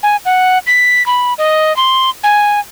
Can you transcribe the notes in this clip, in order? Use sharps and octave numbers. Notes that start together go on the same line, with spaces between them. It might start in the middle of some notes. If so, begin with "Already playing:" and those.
G#5
F#5
B6
B5
D#5
C6
G#5